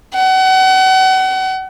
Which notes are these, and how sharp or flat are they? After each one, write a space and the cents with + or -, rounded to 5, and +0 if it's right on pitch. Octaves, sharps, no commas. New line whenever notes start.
F#5 +35